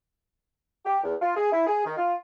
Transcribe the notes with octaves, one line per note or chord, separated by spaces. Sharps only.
G4
E2
F4
G#4
E4
G#4
D#3
F4